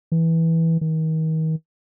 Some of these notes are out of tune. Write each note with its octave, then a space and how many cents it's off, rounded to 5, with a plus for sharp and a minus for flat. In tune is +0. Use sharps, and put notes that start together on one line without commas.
E3 -10
D#3 +35